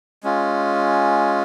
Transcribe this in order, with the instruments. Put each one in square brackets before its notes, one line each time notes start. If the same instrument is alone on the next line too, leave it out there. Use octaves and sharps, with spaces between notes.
[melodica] G#3 C#4 F4